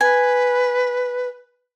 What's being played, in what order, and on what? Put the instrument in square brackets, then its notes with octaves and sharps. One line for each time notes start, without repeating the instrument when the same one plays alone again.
[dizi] B4 [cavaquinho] G#5